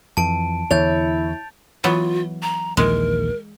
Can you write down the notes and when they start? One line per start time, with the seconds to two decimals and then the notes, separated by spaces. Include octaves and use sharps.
0.17 F2 E3 A5 D7
0.71 E2 D3 E4 C#5 G6 A6 F7
1.84 E3 F#3 B3 F4
2.42 A#5
2.77 A#1 D#2 E3 G#3 A#4